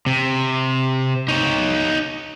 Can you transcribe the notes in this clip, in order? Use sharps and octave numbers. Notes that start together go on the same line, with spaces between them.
C3
D#4 C#5